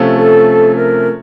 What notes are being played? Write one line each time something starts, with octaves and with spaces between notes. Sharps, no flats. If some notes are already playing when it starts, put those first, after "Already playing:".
Already playing: C3 F3 A3 C#4
A4
A#4